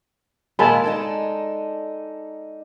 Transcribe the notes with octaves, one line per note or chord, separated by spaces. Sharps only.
D#2 A#2 G#3 A#4 G#5 A5 B5
D4 D#4 A4